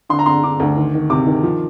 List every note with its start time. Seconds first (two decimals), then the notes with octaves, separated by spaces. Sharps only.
0.09 D3 C6
0.19 A#5
0.26 D3 C6
0.43 D3 D6
0.60 D2
0.76 D#3
0.94 D#3
1.10 C3 D6
1.26 D#3
1.43 F3